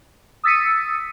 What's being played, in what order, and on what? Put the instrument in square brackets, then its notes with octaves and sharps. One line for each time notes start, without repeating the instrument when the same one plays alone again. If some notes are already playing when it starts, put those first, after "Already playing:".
[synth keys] D#6 E6 A6 B6 C#7 D#7